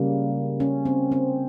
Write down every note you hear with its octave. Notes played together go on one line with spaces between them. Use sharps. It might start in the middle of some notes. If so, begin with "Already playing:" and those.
Already playing: C#3 G3 A#3
C#4
C4
C4